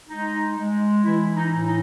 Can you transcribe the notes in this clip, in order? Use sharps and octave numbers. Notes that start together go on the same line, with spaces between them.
G#3 D#4
G#3
E3 E4
D#4
A2
D#4